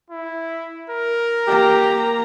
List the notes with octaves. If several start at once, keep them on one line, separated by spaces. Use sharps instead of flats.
E4
A#4
A#3 G4 A#5